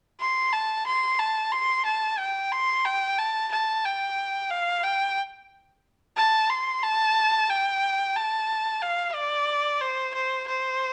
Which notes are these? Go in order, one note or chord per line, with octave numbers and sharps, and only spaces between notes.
C6
A5
C6
A5
C6
A5
G5
C6
G5
A5
A5
G5
F5
G5
A5
C6
A5
G5
A5
F5
D5
C5
C5
C5